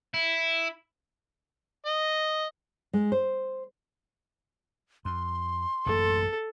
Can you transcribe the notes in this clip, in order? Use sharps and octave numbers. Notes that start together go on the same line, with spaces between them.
E4
D#5
G#3
C5
F2 C6
A1 F#2 A#3 A4